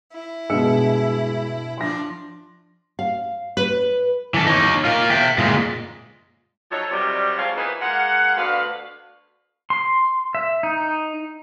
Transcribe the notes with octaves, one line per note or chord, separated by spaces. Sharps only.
E4
G2 B2 G#3 E6 C#7
F3 D4 C6 A#6
F5
B4
E3 A4
D#4 C#5
F4 A#4
E5 G5
A#2 G#3
F3 F#3 D#4 A4 C#5
C3 D#3 F#3 G3
G#2 F3 C4 F4 C#5 F5
E3 A#3 B3 D#4 E4 B4
G#3 A#3 F5 F#5
D2 B2 D4 B4 F5
C6
E5
D#4